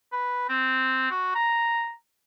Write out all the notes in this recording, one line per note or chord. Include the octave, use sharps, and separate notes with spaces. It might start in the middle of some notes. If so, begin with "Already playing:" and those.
B4
C4
F#4
A#5